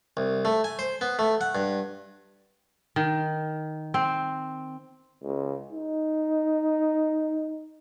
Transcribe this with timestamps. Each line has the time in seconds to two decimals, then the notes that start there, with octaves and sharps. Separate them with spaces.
0.17 C2
0.45 A3
0.64 G#5
0.79 C5
1.01 B3
1.19 A3
1.41 F#5
1.55 G2
2.96 D#3
3.94 C4
5.23 C#2
5.72 D#4